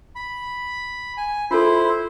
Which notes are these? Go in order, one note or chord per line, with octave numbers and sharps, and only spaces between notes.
B5
G#5
E4 F4 A4 C5